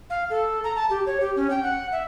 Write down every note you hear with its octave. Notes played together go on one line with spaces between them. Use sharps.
F5
A4
A#5
A5
G4
C#5
G4
C#4
G5
F#5
E5